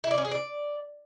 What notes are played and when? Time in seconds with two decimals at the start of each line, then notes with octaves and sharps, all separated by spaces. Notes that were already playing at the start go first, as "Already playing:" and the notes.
0.04 E4
0.11 D5
0.18 C#4
0.25 G#4
0.31 D5